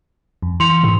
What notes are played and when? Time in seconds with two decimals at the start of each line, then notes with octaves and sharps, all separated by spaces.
0.42 F2
0.60 E3 C6 C#7 F7
0.83 G#2